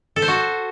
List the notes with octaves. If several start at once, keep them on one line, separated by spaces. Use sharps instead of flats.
A4
C5
F#4